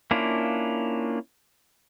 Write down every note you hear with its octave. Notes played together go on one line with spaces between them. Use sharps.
A#3 C#4 D4 E4 F4